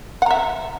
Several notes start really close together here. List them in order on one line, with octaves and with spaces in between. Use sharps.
F#5 A#5 E5